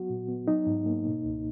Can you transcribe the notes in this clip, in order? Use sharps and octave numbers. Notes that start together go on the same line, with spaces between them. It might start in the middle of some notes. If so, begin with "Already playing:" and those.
Already playing: F#3 B3 F#4
A#2
B3
F#3 D#4
G#2
A#3
B2
C#2